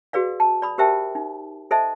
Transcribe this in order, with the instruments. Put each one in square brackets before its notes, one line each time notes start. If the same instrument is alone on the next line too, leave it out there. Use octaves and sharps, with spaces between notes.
[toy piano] F#4 G#4 B4 D5 F5
A5
D5 B5 D#6
G4 A#4 C5 E5 G5 A5
D#4
A4 C5 D#5 E5 A5